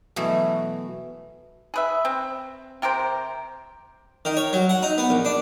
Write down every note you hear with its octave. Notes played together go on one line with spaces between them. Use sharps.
B2 E3 F#3 A3
G#4 B4 E5
C4
C3 G4 A#4 C5
D#3
C#5
F#3
F#5
D#4
B3
A#1
D4